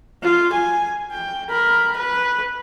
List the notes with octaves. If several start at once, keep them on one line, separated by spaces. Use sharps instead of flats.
F4
G#5
G5
A#4 B5
B4